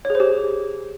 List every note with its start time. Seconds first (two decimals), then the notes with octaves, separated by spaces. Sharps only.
0.05 C#5
0.10 G#4
0.15 C5
0.20 G4